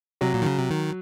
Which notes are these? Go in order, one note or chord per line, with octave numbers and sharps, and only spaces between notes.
C3 F#3
A#2
D#3
C#3
C3
D#3